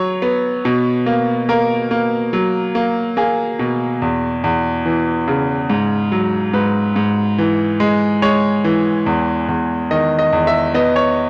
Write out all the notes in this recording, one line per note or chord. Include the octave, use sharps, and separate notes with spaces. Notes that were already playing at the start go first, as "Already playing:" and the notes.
Already playing: F#3 C#5
B3
B2
A#3
A#3 A#4
A#3
F#3
A#3
A#3 G#4
B2
E2
E2
E3
C#3
G#2
F#3
G#2 B4
G#2
E3
G#3
G#3 C#5
E3
E2
E2
D#3 D#5
D#5
E2
E5
B3 D#5
C#5